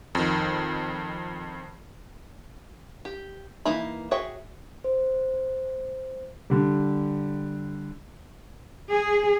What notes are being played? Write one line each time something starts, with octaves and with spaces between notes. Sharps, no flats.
F2 D#3
G4
E3 A#3 D#4 E5 B5
F#4 G#4 C#5 E5 G5
C5
D3 G3
G#4